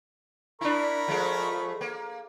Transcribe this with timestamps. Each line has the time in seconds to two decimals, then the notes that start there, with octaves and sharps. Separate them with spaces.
0.61 D4 E4 A#4 B5 C#6
1.08 F3 G#3 A3
1.81 A#3